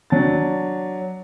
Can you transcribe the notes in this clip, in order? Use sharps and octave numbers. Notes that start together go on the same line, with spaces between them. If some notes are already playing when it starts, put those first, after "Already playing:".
F#3 D4 A5 A6